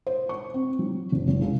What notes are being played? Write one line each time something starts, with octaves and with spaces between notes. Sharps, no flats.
C5
C#6
C4
F#3
F#1
F#1
C#2